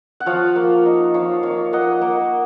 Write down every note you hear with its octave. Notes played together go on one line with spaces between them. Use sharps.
F#5
F3 C#5 F5
A#3
D#4
F3 C#5 F5
A#3 C#5 F5
A#3 D#5 F#5
A#3